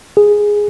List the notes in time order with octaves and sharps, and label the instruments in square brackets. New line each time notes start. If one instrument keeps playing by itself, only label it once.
[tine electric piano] G#4